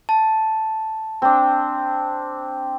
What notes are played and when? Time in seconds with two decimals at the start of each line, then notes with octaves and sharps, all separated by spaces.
0.09 A5
1.22 C4 D4